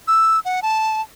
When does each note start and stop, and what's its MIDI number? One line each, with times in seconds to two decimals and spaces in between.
0.08 0.40 88
0.45 0.60 78
0.62 1.01 81